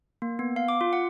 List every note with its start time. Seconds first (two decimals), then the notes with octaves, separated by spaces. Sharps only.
0.22 A#3
0.39 B3
0.56 F5
0.68 D6
0.81 F4
0.93 F#5